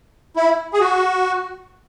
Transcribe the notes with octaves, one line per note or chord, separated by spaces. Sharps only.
E4
G#4
F#4